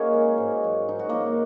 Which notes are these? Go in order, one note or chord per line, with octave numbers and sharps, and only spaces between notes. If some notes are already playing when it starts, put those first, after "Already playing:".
Already playing: A#3 C#4 D#4 F#4 G#4 A#4 C#5
G#3
G#2
F#3
G#2 D#4
F#4
F#3 A#3 D#4